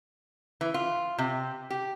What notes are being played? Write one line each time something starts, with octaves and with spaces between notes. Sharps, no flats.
E3
F4
C3
G4